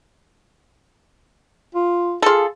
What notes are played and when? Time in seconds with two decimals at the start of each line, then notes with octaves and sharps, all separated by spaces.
1.75 F4
2.22 F4 G#4 A4